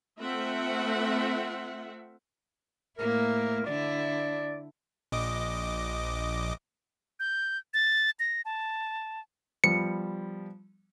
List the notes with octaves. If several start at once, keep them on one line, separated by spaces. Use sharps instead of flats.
A3 C4 F4 E5 F#5
A2 A#3 E4 A#4
D3 D4 E4 D5
A#1 D#5 D6
G6
A6
A#6
A5
F3 G3 B3 C#7